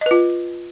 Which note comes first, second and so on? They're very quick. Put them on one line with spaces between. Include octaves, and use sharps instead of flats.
D#5 B4 F4